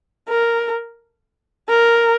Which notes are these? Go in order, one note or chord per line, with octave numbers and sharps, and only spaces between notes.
A#4
A#4